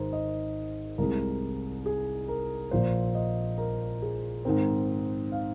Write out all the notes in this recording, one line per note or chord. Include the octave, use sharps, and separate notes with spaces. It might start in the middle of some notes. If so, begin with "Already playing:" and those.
Already playing: G#1 G#2 G#3 D#4 A#4 C5
D#5
C2 C3 G#3 A#4
G#4
A#4
A#1 A#2 A#3 C5
D#5
A#4
G#4
G#2 D#3 C4 A#4
F5